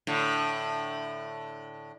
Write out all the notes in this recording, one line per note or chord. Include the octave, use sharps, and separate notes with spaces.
A2 D3